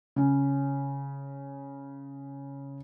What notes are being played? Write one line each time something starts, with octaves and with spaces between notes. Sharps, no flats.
C#3 C#4